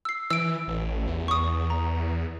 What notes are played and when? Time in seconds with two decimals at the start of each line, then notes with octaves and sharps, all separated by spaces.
0.05 E6 C7
0.30 E3 E6 D7
0.68 A1
1.07 E2
1.28 C#6 D#6
1.70 A#5